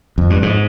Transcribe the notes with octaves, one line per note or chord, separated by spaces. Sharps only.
F2
G2
G#2